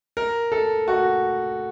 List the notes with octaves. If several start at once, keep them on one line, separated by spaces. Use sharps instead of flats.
A#4
A4
F#4